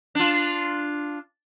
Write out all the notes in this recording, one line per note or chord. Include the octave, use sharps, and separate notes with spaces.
D4 F4